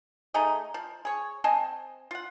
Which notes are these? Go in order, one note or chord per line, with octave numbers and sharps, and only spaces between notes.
A3 D#4 G#4 D#5
F3
G#4 C#5
C4 D#5 G#5 A5
F4 F#5